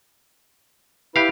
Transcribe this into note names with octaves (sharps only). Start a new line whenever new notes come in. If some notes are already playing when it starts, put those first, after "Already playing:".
E4 G4 B4 F5